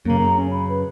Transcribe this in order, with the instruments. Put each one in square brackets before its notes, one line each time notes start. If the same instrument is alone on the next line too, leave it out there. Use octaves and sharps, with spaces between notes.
[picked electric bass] F#2 C#3 [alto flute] A#3
[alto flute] A#5
C#4
B5
B4